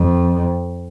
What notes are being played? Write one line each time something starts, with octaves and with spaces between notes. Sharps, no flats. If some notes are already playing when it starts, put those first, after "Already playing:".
Already playing: F2